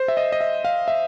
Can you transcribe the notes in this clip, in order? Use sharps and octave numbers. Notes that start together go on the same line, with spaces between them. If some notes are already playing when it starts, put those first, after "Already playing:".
Already playing: C5
E5
D#5
D#5
E5
F5
E5